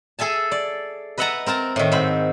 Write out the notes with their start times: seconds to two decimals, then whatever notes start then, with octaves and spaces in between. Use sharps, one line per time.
0.19 G#4 A4 E5 G#5 A5
0.51 D5
1.18 B4 D#5 E5 F#5 A5 A#5
1.46 C4 A#4 A5 A#5
1.76 A2 D#3
1.92 G#2 C4 B5